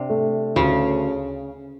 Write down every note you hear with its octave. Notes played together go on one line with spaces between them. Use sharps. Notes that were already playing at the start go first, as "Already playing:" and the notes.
Already playing: C3 D4
A3
D2 C#3